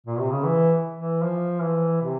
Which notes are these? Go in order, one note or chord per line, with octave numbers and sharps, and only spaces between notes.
A#2
C3
C#3
E3
E3
F3
E3
C3